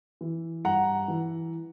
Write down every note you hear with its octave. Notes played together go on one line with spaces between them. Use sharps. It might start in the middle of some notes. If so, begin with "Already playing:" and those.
E3
G2 F#5 A#5
E3